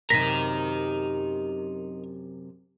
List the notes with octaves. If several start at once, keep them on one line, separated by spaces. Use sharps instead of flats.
F#2 C3 D#4 A#4 A#6 B6